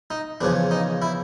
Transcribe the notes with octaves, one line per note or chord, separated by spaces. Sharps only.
D#4
E2 C#3 F3 D4
D#4
E4